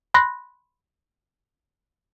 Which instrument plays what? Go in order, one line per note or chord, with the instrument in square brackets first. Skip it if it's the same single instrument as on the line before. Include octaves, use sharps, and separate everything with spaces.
[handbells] B5 C6 F#6 A#6